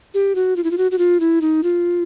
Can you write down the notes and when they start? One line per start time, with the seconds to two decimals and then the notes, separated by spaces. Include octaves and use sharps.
0.14 G4
0.35 F#4
0.56 F4
0.64 E4
0.71 F4
0.78 F#4
0.92 F#4
0.98 F4
1.20 E4
1.41 D#4
1.63 F4